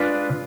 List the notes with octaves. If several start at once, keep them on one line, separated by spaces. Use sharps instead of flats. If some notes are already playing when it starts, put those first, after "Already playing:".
Already playing: G#3 D4 F4 B4